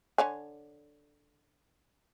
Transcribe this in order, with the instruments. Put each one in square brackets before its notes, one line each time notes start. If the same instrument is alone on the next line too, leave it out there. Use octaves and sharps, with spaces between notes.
[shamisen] D3 C#5 G#5